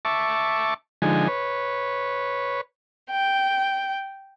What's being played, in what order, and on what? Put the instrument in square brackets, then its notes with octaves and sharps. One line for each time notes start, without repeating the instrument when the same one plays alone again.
[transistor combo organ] E5 A5 C#6 D6
D3 F3 G#3 D#4 G#5
B4 C#5
[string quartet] G5